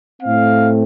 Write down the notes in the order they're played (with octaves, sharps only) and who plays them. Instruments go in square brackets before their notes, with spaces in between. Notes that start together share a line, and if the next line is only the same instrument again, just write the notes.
[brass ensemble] A2 A3 C4 F5